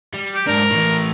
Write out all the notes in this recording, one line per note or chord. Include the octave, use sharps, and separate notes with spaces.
G3
G4
G#2 D4 A#4
A2 E3